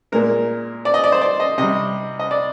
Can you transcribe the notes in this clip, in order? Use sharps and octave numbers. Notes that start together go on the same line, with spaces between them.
A#2 G#3 A#4
D5
D#5
D5
C5
D5
D#5
C3 G3 D#5
D#5
D5